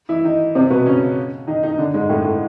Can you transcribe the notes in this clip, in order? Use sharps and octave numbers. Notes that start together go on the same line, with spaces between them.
E3 E4
D#3 D#4
C3 C4
B2 B3
C#3 C#4
D#3 D#4
D#3 D#4
D3 D4
G#2 G#3
A2 A3
A2 A3